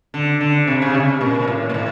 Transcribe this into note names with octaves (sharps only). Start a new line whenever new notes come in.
D3
D3
C3
C#3
C3
A#2
A2
A#2
A2